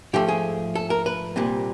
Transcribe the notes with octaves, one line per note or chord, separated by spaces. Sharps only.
G#2 F3 A3 G4
G#4
A4
A#4
B4
C2 A#2 G3 C4